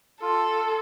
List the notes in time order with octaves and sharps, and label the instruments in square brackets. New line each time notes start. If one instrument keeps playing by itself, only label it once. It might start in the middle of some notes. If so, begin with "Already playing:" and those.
[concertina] F4 [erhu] A4